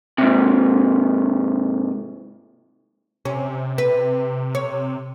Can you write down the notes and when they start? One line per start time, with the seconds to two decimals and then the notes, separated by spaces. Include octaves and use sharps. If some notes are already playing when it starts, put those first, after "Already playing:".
0.18 G#2 C3
3.25 C3 C#4
3.78 B4
4.55 C#5